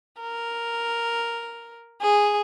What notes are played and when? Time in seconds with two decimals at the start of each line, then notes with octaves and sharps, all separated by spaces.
0.20 A#4
2.01 G#4